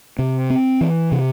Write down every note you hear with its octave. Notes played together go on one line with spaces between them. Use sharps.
C3
C4
E3
C3